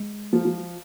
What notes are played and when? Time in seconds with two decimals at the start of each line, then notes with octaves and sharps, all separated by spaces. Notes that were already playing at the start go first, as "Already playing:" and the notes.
Already playing: G#3
0.33 F3
0.45 F3